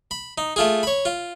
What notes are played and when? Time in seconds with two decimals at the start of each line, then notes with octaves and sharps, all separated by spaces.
0.11 B5
0.38 D#4
0.56 A3 F4 G#4
0.83 C#5 B5
1.05 F4